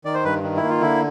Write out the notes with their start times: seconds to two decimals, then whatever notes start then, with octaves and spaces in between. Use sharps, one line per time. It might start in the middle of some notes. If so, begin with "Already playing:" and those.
0.05 D#3 D5
0.14 C5
0.24 G2 B4
0.43 D#3
0.56 E4
0.62 A#3
0.69 F4
0.80 D3 E4